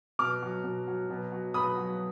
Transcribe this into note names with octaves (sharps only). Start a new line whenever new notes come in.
B2 D6 F6
F#3
B2
F#3
B2
F#3
B2 B5 D#6
F#3